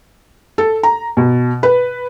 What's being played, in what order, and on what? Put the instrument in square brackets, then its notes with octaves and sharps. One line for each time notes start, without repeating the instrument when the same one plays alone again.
[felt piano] A4
A#5
B2
B4